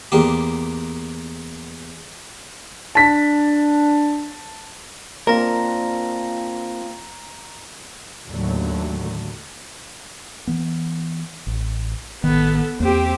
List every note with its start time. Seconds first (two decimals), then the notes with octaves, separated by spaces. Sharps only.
0.12 E2 A#3 G4
2.95 D4 A5 B6
5.27 A#3 C4 D4 F4 A#4 A#5 A#6
8.29 D#2 A2 D3 F#3 A3
10.47 E3 B3
11.47 A1
12.24 A1 D#3 B3 A4
12.80 E2 A#3 C4 G4